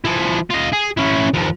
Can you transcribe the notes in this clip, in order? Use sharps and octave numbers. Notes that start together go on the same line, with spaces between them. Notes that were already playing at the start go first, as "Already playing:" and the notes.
F3 E4
F4 D#5
G#4
C#4 E4
D#2 F3